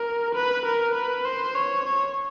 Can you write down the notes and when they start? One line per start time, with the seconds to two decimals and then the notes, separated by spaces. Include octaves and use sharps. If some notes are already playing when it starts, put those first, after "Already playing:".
Already playing: A#4
0.35 B4
0.65 A#4
0.95 B4
1.25 C5
1.55 C#5
1.85 C#5